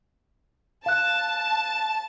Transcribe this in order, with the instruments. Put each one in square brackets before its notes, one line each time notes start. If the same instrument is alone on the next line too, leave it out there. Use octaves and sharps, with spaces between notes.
[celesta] F5 F#6 [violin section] A5